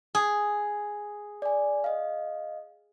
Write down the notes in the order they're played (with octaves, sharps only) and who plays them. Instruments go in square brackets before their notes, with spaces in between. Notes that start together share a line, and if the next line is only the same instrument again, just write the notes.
[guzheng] G#4
[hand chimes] D5 G#5
D#5 F5